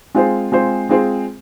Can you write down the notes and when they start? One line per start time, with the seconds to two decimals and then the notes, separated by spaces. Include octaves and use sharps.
0.15 G#3 C4 F4 G#4 C5
0.52 G#3 C4 F4 G#4 C5
0.89 G#3 C4 F4 G#4 C5